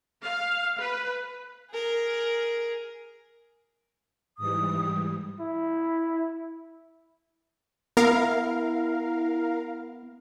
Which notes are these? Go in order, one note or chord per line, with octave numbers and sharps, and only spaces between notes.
F5
B4
G#4 A#4
G#2 E3 G3 D#6
E4
B3 E4 A#4 F5